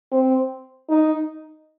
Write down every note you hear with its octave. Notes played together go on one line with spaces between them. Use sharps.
C4
D#4